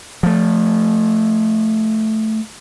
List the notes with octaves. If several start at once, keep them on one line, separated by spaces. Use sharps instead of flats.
F3 A3